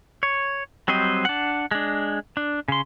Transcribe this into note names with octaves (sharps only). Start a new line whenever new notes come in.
C#5
F#3 G3 C4 C5 D#5
D4 F#5
G#3 D4
D4
C#3 C6